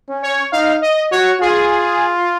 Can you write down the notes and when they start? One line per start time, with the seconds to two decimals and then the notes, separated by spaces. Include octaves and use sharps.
0.09 C#4
0.22 C#5
0.52 D#4 F5
0.82 D#5
1.11 F#4 C#5
1.41 F4 G#4